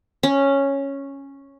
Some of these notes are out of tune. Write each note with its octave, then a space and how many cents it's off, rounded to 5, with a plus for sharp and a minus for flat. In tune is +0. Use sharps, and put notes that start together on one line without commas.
C#4 -5